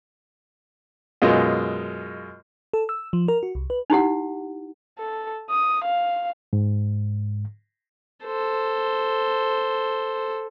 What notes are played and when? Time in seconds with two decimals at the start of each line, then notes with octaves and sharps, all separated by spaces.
1.22 F#2 B2 G#3 F4
2.73 A4
2.89 E6
3.13 F3
3.28 A#4
3.43 F#4
3.55 C2
3.70 B4
3.90 D#4 E4 G4 F#5
4.99 A4
5.50 D#6
5.85 F5
6.53 G#2
8.25 A4 C5